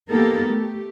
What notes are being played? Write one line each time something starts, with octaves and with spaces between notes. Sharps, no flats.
A#3 B3 D#4 G4 A4 A#4
A3 G4